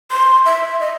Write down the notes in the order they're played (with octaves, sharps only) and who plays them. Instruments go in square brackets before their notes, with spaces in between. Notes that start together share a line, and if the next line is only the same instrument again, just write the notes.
[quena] C6
E5
D#5